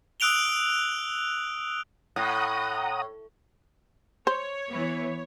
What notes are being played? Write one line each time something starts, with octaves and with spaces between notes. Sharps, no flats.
D#6 E6 F#6 D7 F7 G7
A2 F#5 A#5 D#6
C5 C#5
E3 B3